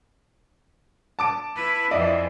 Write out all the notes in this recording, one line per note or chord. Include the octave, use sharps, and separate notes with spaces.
A5 D6 D7
E4 B4
F2 E3 E4 D5 D#5